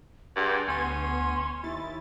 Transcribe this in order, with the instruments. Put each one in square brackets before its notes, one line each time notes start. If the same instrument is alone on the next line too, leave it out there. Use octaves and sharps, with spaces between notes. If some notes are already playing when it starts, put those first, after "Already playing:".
[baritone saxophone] G2 [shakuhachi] G#4 [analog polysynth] F#5 C6
[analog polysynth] D2 B3 D#7 [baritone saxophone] C#4 [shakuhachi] C6
[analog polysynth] D#2 E4 A6 [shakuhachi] D#4